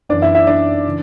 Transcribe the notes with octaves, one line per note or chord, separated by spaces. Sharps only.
F#2 E3 B3 D4 D5
E4 E5
E4 E5
D4 D5
C#3 E3